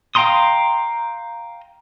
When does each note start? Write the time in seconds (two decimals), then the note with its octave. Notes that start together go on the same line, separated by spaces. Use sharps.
0.15 F5 G5 A#5 C6 D#6